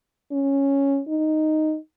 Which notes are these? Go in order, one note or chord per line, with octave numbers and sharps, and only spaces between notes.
C#4
D#4